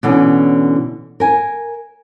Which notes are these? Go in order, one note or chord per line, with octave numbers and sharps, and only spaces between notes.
B2 D3 E3 C#4
A#4 G#5